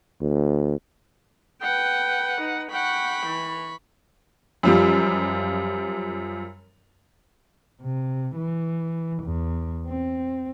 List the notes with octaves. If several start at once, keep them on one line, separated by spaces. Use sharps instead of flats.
D2
B4 F#5 G5
D#4
F#5 G5 B5 C#6
E3
F#2 F3 G3
C3
E3
E2
C4